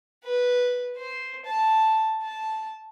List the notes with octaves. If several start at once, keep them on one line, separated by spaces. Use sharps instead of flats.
B4
C5
A5
A5